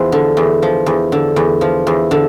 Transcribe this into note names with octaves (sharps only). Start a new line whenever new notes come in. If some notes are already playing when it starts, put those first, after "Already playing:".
Already playing: E2 F3 C5
D3
E2
F3
E2
D3
E2
F3
E2
D3